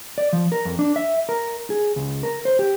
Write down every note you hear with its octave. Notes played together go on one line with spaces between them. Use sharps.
D5
F3
A#4
F2
D4
E5
A#4
G#4
C#2
A#4
C5
G4